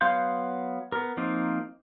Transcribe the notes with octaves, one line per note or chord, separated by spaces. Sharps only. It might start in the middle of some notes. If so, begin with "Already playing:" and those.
F#3 B3 F5 C6 G6
B3 A#4
F3 A#3 C4 D#4